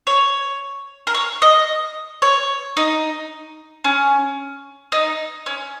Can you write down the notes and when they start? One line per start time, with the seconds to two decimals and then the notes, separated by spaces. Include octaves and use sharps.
0.07 C#5
1.07 A#4
1.14 C#5
1.42 D#5
2.22 C#5
2.77 D#4
3.84 C#4
4.92 D#4
5.46 C#4